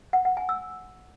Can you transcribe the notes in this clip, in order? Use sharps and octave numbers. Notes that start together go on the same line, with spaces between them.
F#5
F#5
G#5
E6